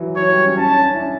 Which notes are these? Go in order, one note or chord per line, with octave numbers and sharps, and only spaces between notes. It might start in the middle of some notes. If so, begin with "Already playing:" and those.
Already playing: E3 F#3
F#3 C#5
G3
C#4
C#4 A5
D4
C#4
E4
D4